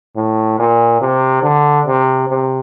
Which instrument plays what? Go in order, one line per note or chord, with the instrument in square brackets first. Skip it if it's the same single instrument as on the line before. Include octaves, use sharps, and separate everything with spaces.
[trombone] A2
A#2
C3
D3
C3
C3